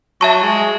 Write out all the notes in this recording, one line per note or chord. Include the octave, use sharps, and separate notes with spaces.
F#3 E5 A5 C#6
G#3